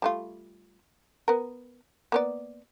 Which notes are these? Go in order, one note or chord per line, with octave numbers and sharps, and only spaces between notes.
G3 A3 F4
B3 A#4
A#3 B3 D5